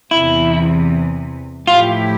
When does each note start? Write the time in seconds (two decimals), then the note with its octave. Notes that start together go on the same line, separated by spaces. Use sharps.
0.11 E2 C3 E3 E4
1.66 A2 F3 A3 E4 F4 G4